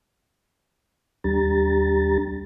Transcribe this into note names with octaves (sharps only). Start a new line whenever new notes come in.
D#2 G3 D4 G4 A#5 A6